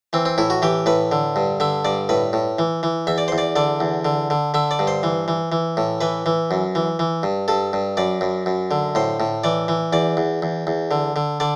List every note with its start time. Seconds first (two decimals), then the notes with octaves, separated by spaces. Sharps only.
0.13 E3 C4
0.25 C4
0.38 A2 E4
0.50 F#4
0.62 E3 G4
0.86 A2 B4
1.12 D3
1.36 G2
1.60 D3 E5
1.85 G2 D5
2.09 A2 B4
2.33 A2
2.59 E3
2.83 E3
3.07 E2 E5
3.18 D5
3.28 E2 C5
3.38 D5
3.56 D3 D5
3.80 E2
4.05 D3
4.30 D3
4.54 D3 E5
4.71 D5
4.79 G2
4.87 C5
5.03 E3
5.28 E3
5.52 E3
5.77 A2
6.01 E3 B4
6.26 E3
6.51 F#2
6.75 E3
6.99 E3
7.23 G2
7.48 G2 A4
7.73 G2
7.97 F#2 D5
8.21 F#2
8.46 F#2
8.71 D3
8.95 A2 C5
9.20 A2
9.44 E3 D5
9.68 E3
9.93 E2 D5
10.17 E2
10.42 E2
10.67 E2
10.91 D3
11.16 D3
11.40 D3 D5